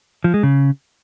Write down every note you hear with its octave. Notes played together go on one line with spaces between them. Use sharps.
F3
G#3
C#3